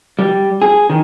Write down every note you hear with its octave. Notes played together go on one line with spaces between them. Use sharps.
G3
G#4
D#3